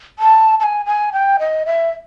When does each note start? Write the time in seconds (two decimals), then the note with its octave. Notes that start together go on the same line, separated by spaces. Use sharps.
0.19 A5
0.60 A5
0.64 G#5
0.86 G#5
1.13 G5
1.40 D#5
1.66 E5